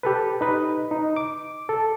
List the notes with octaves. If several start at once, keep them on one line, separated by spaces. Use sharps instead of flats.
G4 A4 B4
D#4 B4 D#5
D#4
D6
A4